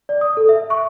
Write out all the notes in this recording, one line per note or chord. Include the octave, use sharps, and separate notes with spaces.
D5
D#6
A4
E5
C#6